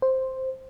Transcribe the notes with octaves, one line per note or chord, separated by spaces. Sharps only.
C5